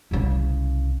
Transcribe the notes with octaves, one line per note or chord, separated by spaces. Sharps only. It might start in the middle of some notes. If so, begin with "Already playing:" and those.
C2 C#3